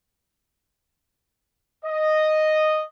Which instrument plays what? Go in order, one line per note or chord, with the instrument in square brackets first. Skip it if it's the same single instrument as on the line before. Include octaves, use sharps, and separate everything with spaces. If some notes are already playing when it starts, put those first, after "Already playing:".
[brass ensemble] D#5